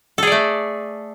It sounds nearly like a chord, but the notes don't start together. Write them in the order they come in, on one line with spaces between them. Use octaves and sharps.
A4 G#4 D5 A3